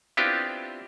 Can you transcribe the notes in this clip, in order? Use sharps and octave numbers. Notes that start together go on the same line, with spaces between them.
B3 C4 D4 E4 F4 G4